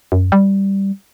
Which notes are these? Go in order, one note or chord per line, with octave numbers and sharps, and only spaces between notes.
F#2
G3